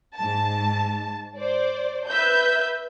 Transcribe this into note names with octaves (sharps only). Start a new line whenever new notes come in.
G#2 A5
C5 D5
B4 E5 G6